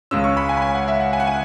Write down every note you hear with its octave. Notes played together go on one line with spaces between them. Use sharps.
C#2 C#3 G#3 C#4 E6
C#6
B5
G#5
B5
G#5
F#5
E5
F#5
G#5
F#5
G#5